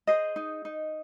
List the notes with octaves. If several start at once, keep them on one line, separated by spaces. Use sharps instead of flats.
G#4 C5 D#5
D#4
D#4